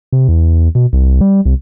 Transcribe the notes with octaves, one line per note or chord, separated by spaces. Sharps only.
C3
E2
B2
C2
G3
C2